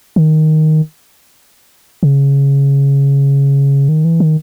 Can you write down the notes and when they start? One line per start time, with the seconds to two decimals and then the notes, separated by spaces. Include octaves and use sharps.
0.16 D#3
2.03 C#3
3.89 D#3
4.05 E3
4.20 D#3